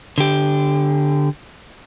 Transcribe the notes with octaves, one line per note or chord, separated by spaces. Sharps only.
D3 G4